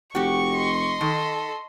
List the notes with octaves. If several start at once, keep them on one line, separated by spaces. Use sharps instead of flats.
F1 F#4 G4 C#6
D#5 C6
D#3 A4